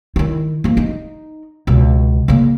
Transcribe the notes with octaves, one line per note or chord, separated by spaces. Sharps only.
D#3 E4
F3 A#3
D#4
C#2 B2
C#3 A#3